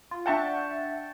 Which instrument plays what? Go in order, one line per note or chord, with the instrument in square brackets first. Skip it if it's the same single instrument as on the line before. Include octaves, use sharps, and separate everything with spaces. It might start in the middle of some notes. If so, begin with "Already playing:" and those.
[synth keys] F4
[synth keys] D4 E5 F#5 [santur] G5 A5 C#6